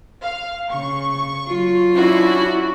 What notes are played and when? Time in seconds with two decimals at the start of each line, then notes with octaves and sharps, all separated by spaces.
0.22 F5
0.71 C#3 C#6
1.48 F#3 F4
1.93 C#4 D4 E4 F#4